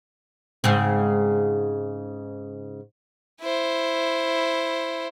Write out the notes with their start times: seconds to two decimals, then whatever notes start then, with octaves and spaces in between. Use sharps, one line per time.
0.64 G#2 C#3 C4
3.41 E4 C5